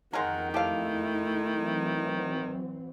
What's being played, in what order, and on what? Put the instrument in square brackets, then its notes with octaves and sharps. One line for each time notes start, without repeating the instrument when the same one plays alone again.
[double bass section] F2 [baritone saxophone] D#3 [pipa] G#3 A#4 [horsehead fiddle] F#5
[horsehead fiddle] A3 E4 [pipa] G4 A4 F5
[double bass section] E3 F#3 C4